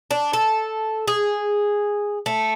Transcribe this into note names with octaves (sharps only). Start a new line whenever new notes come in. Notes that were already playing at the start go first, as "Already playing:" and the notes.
D4
A4
G#4
A3